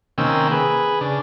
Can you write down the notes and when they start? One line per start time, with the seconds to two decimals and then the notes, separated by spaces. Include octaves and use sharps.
0.18 C3 D#3 A#3 C#4 G5 E6
0.51 G#4 B4
1.01 C#3 D4